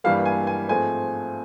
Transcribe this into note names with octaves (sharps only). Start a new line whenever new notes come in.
G2 E3 G3 A#3 F5
G#5
G#5
G#2 F3 A3 C4 G#5